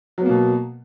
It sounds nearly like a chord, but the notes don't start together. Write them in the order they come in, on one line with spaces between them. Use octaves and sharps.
F#3 B3 A#3 B2